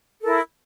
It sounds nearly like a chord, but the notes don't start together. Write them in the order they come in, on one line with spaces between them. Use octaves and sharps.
A4 A#4 E4